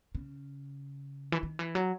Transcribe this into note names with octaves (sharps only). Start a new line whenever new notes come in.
C#3
E3
D#3
E3
F#3